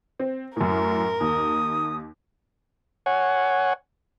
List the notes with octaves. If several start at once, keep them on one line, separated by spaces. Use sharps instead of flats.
C4
F#2 A2 A#4
D#2 D#6
C#5 F#5 G#5